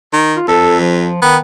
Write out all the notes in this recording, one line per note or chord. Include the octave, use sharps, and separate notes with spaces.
D#3
F4
F2 A4
F3
D#3 B3